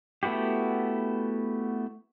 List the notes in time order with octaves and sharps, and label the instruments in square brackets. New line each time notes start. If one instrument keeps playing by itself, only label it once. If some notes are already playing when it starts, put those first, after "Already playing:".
[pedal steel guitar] A3 B3 E4 F#4 G4